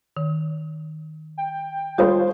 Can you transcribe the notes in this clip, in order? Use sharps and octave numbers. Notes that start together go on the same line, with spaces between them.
D#3
G5
G3 F4 A4 C5 C#5 D#6